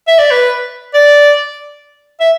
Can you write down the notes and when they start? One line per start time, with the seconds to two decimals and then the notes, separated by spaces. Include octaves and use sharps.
0.08 E5
0.19 D5
0.31 B4
0.94 D5
2.20 E5